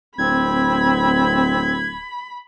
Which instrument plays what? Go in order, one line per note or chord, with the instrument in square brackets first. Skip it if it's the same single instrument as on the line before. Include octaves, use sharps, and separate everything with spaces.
[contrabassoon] D1 [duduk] C4 [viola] B5 [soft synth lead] G#6